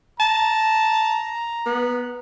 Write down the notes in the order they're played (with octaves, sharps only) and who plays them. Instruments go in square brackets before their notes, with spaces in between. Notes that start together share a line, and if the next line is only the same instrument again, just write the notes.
[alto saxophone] A5 [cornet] A#5
[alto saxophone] B3